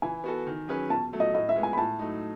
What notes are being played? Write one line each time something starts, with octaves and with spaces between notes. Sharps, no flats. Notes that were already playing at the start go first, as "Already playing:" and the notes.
E3 G#5
B3 F#4 A4
D#3
F#3 C#4 G#4 B4
B2 A5
F#3 A3
D#5
A2 D#5
E5
G#3 B3
G#5
B5
A2 A5
F#3 A3 D#4